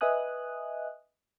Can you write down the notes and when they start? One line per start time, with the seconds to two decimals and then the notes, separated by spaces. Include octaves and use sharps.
0.01 B4 D#5 E5 G#5 D#6 F#6